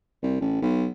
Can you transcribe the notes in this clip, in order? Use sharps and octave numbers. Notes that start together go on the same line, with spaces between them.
C2
A1
B1